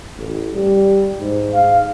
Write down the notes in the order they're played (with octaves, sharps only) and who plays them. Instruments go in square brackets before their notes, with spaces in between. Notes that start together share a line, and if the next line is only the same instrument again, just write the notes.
[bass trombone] A1
G3
G#2
[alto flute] F5